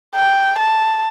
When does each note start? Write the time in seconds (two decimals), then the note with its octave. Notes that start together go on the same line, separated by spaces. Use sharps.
0.15 G5
0.58 A5